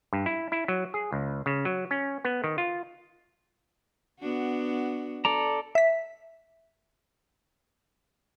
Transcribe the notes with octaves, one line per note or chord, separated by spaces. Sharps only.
G2
E4
E4
F#3
G#4
C#2
C#3
F#3
C#4
B3
D#3
F4
B3 D4 F#4
A4 D5 A#5
E5 B6